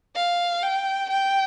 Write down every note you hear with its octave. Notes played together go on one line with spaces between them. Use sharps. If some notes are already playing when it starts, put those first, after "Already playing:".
F5
G5
G5